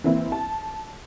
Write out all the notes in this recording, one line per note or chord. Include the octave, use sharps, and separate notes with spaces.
E3 A#3 C4 E4
A5